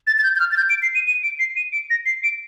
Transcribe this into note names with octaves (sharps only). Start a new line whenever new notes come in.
A6
A6
G6
G6
F6
A6
G6
D7
C7
D#7
D#7
D7
C7
D#7
D7
A#6
C7
D7